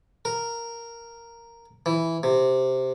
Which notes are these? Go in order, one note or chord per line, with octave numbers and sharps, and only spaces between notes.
A#4
E3
C3